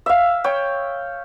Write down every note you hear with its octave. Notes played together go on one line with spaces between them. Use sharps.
E5 F5
C#5 G5